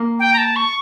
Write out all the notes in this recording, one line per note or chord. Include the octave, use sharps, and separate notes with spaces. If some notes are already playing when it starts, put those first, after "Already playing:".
Already playing: A#3
G5
A#5
A5
C#6